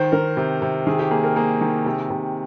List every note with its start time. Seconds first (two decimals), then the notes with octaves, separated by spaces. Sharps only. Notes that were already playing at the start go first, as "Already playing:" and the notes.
Already playing: D#3 C5
0.12 D#3 A#4
0.37 C3
0.62 C3
0.87 D#3 G#4
0.99 G4
1.11 A#3 G#4
1.24 A#4
1.36 A#3 G#4
1.61 D#3
1.86 C3
2.10 C3